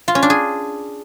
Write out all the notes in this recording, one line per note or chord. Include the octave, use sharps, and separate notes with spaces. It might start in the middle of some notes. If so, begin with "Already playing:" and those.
F4
C#4
D4
G#4